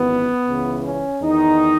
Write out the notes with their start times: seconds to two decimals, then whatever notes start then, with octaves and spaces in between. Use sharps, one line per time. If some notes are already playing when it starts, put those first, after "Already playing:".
Already playing: G#1 F#2 E3 B3
0.47 C#2 C#3 E3
0.85 C#4
1.22 E2 D#3 D#4